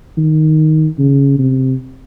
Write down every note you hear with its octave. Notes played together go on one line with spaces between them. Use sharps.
D#3
C#3
C3